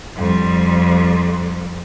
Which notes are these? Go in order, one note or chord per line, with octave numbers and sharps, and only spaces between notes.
F2 G3